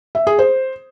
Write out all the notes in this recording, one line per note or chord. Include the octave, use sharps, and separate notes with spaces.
E5
G#4
C5